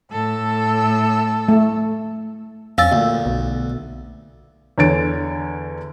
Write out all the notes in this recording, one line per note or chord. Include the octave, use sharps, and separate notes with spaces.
A2 A4 E6
A3
F2 C#4 F5 E6 A6
D2 A#2
B1
E2 D3 C#5 A6 D7